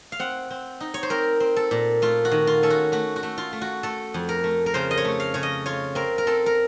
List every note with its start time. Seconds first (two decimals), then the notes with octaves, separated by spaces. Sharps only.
0.12 F5
0.19 C4 F#5
0.50 C4
0.80 D#4
0.94 C#5
1.03 C5
1.10 C4 A#4
1.40 C4
1.56 A4
1.71 A#2
2.02 A3 F4
2.25 F#4
2.31 D#3
2.47 F4
2.63 C#4 A4
2.70 F#4
2.92 A3 F#4
3.16 F#4
3.23 A3
3.38 F4
3.53 A3
3.61 F#4
3.83 A3 A4
4.14 F2
4.29 A#4
4.44 A3
4.66 A#4
4.74 C#3 C5
4.91 D#5
4.97 C#5
5.05 A3
5.20 F5
5.34 C#3 C#5
5.43 D#5
5.66 F4 C#5
5.95 C4 A#4
6.18 A#4
6.27 C4 A4
6.46 A#4